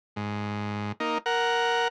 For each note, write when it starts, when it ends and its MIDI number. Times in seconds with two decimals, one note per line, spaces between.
0.16 0.92 44
1.00 1.18 58
1.00 1.18 63
1.26 1.88 70
1.26 1.88 78